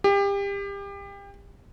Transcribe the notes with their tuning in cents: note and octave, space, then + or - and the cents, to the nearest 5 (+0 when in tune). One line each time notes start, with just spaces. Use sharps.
G4 +30